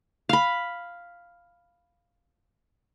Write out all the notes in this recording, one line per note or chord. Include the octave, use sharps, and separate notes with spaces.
F5 B5